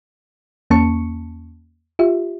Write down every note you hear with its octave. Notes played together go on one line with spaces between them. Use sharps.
E2 A#3 C#4 A5 C#6 C#7
F4 G4 E5